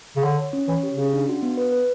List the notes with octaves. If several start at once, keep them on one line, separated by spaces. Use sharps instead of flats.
C#3
D3 C#5
C#5
C#4
E3 C#5
G4
C#3
C#4
D4
F#4
B3
B4
B4